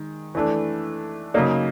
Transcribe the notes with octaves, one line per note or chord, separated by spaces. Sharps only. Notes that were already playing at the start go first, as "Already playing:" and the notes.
Already playing: D#3 G#3
E3 A3 D4
C#3 F#3 A#3 D#4